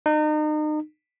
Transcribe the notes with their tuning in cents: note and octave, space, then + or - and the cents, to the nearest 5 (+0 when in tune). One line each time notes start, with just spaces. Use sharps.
D#4 -35